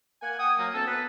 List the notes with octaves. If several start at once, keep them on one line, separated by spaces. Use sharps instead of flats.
A#3 F#5 G#5
F#5 G5 D#6
F#3 A#3
D2 C4 A4
B3 B4